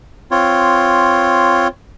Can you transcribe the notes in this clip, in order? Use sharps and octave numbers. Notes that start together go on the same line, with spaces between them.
C4 F4 C#5